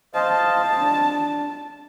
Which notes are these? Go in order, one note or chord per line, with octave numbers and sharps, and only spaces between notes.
C5 D#5 F5 A5
D4